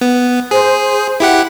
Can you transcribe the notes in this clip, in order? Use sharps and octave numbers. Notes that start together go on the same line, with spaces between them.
B3
G#4 C5
E4 G4 F#5